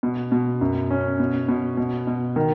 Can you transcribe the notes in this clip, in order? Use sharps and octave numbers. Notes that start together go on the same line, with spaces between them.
B2
B2
F#2
C#4
B2
B2
B2
B2
D#3